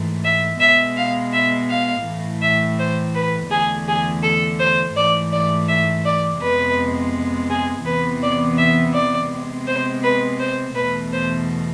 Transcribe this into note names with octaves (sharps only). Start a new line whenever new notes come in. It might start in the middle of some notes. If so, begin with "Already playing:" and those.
Already playing: G#2 E3 A3
E5
B2 G#3 B3 E5
F5
E5
F5
A2 E3 A3
E5
C5
B4
E2 D3 A3 G#4
G#4
A4
C5
G#2 E3 A3 D5
D5
E5
D5
F2 C3 G#3 B3 B4
G#4
E2 C3 E3 B3 B4
D5
E5
D5
C3 G#3 B3
C5
B4
C5
E2 B2 A3 B4
C5